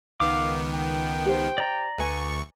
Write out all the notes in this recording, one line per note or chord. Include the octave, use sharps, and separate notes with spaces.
C#2 D#3 B3 F5 D6
G5
G4 C5
D5 A#5
D2 B4 G#5 C#6